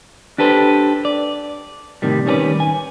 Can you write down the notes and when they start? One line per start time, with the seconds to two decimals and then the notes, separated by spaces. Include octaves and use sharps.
0.38 D4 G4 A4 B4 C5
1.05 D5
2.02 A2 C3 D#3 G3
2.26 D#3 G3 C#4 G#4 B4 D5
2.60 G#5